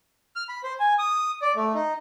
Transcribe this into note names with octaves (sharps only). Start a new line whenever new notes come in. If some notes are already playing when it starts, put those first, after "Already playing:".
F6
B5
C5
G#5
D#6
D5
A3
D#4